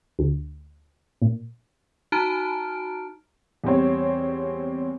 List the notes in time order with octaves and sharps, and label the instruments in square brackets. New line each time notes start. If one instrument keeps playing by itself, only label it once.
[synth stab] D2
A#2
[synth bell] D#4 F#4 A5 A#5 F6 D7
[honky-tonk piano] E2 G3 C4 C#5